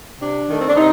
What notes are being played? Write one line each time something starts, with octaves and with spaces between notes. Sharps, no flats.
C3 D4
D#3 A3
C4
D4
C3 C4 D#4